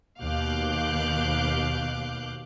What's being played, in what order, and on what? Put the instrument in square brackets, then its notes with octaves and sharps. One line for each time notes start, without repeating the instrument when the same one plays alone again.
[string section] D#2 B2 F5 D6 F#6 G6